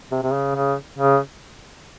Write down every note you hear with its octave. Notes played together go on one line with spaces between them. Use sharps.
C3
C3
C#3
C#3
C#3